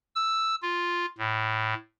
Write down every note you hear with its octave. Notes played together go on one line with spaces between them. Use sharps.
E6
F4
A2